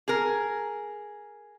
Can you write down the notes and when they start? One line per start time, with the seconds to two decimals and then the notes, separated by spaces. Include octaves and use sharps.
0.08 G#4 A#4